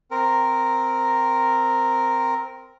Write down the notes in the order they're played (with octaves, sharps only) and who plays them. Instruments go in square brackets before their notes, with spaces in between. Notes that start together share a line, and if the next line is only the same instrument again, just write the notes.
[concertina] C4 A#4